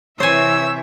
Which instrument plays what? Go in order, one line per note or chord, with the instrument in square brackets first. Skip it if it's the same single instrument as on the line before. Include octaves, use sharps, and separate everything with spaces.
[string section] C3 E3 E5 [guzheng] C5 G#5 [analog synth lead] C#5 [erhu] E6